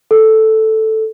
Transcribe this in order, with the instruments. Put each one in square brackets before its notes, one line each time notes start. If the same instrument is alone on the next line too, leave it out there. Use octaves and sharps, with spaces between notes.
[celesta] A4